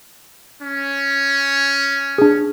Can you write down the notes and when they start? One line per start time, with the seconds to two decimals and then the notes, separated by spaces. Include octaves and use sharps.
0.61 C#4
2.18 D4 G#4